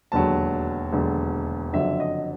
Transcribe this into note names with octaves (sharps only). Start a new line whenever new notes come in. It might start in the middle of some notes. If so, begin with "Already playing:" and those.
E1 D#2 D3 F#3 A5
E1 D#2 D3 F#3
F#1 F2 D3 F#3 E5
D#5